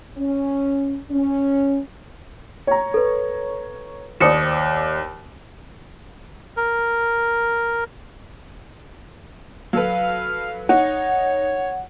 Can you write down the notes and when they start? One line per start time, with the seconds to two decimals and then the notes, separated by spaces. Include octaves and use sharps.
0.17 C#4
1.10 C#4
2.67 C#5 A#5
2.94 A4 B4
4.20 D#2 C5 D5 D#6 C#7 E7
6.57 A#4
9.73 F#3 A4 B4 F5
10.69 D#4 C#5 F#5